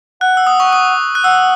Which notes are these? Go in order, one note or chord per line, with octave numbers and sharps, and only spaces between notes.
F#5 F#6
E6
D#6
C#6
D#6
F#6
F#5 E6